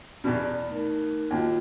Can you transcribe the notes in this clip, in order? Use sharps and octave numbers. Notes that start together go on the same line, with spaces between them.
E2 B2 D5
A3 D#4 A#4
D#2 F4 F#4